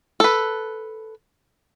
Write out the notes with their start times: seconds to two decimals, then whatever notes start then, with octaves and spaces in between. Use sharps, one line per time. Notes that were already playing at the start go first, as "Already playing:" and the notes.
0.20 A4 B4